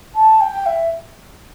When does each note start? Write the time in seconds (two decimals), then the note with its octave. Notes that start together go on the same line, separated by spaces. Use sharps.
0.15 A5
0.41 G5
0.66 E5